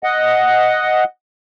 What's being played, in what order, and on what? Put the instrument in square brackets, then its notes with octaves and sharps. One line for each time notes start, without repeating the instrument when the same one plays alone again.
[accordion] D#5 F#5